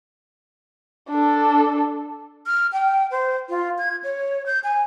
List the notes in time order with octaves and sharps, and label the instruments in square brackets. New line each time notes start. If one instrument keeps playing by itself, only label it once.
[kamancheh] D4 A4
[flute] F6
G5
C5
F4
G#6
C#5
G6
G#5